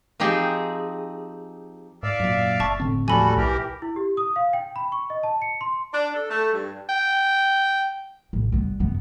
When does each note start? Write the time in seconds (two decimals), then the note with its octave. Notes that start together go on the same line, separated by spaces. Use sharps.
0.20 F3 C4 D#4 G4 G#4
2.03 G#2 D5 E5 F5
2.20 F#2 A#2
2.60 F#1 A5 C#6
2.80 A2 D3 C4
3.08 D#2 A2 F3 G3 F#4 A4 G#5 B5
3.37 B1 E3 G4 A#4
3.82 E4
3.96 G4
4.17 D#6
4.36 F5
4.53 G5
4.76 B5
4.92 C#6
5.10 D#5
5.23 A5
5.42 C#7
5.61 C6
5.93 D4
6.14 A4
6.29 A3
6.52 G2
6.89 G5
8.33 A1
8.52 G3 B3
8.80 F#2 B3